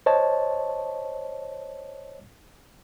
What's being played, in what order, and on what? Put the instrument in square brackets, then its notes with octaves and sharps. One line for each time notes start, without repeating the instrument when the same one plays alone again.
[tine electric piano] C5 C#5 D#5 A5